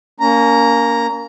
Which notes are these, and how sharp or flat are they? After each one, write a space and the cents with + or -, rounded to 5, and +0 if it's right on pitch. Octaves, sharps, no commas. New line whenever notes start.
A#3 +0 C#4 +35 A#5 +0